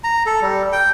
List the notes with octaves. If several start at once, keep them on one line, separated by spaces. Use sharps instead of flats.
A#5
A4
G3
G5